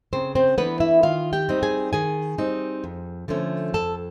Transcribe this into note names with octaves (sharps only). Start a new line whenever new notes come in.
C#3 C4 C5
C4 C5
E3 A3 B3 D4 B4
E4 E5
D#3 F4 F5
G4 G5
G3 C4 D#4
G#4 G#5
D#3 G#4 G#5
G3 C4 D#4
F2
D3 F3 A3 C#4
F2 A4 A5